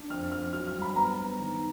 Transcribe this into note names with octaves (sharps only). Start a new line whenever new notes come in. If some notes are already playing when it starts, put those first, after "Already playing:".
Already playing: D4
F2 F6
F2 F6
F#3 F6
F6
G2
B5
B3 A#5
B3
D#3